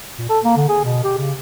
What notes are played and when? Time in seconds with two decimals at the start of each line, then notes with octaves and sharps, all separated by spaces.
0.18 A#2
0.29 A4
0.44 A#3
0.56 D3
0.68 G#4
0.84 B2
1.04 G4
1.18 C#3